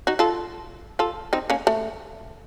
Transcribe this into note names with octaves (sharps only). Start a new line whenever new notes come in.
D#4 F#4
F4 A4
F4 A4
C4 D#4
A#3 C#4
A3